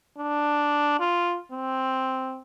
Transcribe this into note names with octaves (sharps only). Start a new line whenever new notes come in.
D4
F4
C4